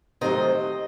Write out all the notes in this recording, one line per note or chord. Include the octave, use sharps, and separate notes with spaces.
C3 D#3 F#3 A3 C5 D#5